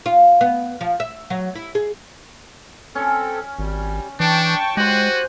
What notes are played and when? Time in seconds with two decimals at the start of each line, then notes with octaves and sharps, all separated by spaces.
0.06 F4
0.41 B3
0.81 F3
1.00 E5
1.30 F#3
1.55 E4
1.75 G#4
2.95 C4 C#4 A4
3.59 G#1 G3
4.20 E3 D4 G5 A5 C#6
4.77 G#3 F#4 G4 C5 G#5 F#6